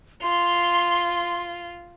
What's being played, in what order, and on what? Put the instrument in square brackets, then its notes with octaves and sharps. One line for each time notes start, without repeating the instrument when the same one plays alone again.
[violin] F4 [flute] C6